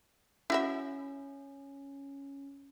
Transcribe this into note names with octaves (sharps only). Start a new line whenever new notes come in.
C#4 E4 F#4 E5